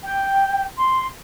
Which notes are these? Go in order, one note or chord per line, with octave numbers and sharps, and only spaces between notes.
G5
C6